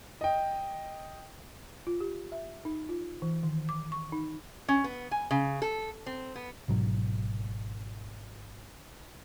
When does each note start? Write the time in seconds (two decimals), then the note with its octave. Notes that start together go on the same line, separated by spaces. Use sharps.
0.21 D#5 G5
1.87 F4
2.00 G4
2.32 E5
2.65 D#4
2.89 F4
3.22 E3
3.43 D#3
3.69 D6
3.92 C#6
4.12 D#4
4.68 C#4
4.84 B3
5.11 G#5
5.31 C#3
5.62 A4
6.06 C4
6.36 B3
6.68 G#1 G#2 B2 F#3